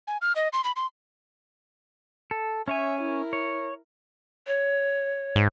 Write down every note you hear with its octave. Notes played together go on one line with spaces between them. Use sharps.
G#5
F6
D#5
C6
B5
C6
A4
C#4 C#5 E5 G#5
E4 A#4
C#5
C#5
G#2